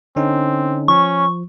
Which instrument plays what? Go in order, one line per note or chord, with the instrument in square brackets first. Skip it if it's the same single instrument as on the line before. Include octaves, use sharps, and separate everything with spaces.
[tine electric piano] D3 C#4 D#4 [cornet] C4
[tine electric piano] F3 [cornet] C#4 [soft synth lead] C#6